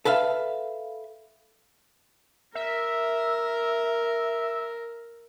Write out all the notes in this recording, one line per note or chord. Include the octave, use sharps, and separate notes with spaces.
A4 B4 E5 F5
A#4 E5